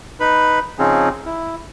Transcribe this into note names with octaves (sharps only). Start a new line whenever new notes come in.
D#4 B4 B5
C#3 F3 C4 C#4 D#4 G#4
E4